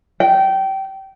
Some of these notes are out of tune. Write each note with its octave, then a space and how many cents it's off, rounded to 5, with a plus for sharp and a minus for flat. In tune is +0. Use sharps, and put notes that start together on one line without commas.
G5 -20